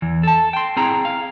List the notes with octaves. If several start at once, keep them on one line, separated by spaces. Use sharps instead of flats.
E2 E3
A4 A5
G5 C6
C4 E4 G#4 G5 A#5
F5